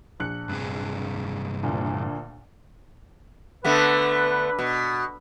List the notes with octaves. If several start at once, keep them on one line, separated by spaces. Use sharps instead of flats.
A#1 F#6 C#7
G2 C3 G#4
D2 A#2
D3 A3 B3 B4
B2